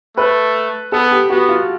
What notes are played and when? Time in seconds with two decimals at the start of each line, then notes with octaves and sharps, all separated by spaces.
0.17 A3 B4
0.92 B3 A4
1.11 G4
1.30 B3 F#4
1.49 F4